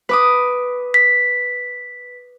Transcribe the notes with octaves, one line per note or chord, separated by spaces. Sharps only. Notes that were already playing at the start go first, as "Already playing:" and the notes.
B4 D6 D#6
B6